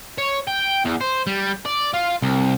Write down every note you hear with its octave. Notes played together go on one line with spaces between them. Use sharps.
C#5
G5
E2
C5
G3
D5
F4
C2